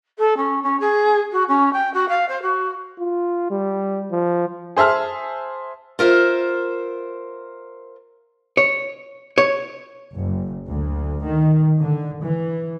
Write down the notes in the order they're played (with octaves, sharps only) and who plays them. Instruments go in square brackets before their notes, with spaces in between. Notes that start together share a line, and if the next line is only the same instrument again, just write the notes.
[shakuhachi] A4
C#4
C#4
G#4
F#4
C#4
G5
F#4
F5
C5
F#4
[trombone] F4
G3
F3
[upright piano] G#4 C5 E5 A5 F6
[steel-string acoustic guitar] F4 A#4 C5 E5
[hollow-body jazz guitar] C#5
C#5
[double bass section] F#1
D2
D#3
D3
E3